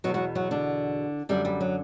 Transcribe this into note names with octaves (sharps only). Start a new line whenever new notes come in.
E2 B2 F#3 F#4
F#3 F#4
F#3 F#4
D3 D4
F#2 D3 G3
G3
F#3